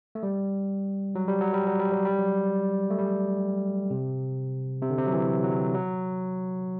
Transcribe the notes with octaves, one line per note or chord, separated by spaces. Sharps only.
A3
G3
F#3
G3
F#3
G3
F#3
G3
F#3
G3
F#3
A3
G3
C3
C3
D3
C3
F#3
E3
F#3
F#3